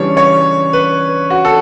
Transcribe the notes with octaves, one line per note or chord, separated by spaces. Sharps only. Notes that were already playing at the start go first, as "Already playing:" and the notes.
Already playing: C#3 E3 G3 D4 C#5
C#5
B4
F#4
A4